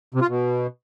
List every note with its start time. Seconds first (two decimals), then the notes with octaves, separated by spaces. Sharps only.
0.14 C3
0.22 F4
0.29 B2